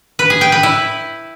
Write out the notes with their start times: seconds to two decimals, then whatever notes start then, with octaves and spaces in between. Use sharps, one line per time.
0.19 B4
0.30 G#4
0.41 G5
0.52 B4
0.63 E4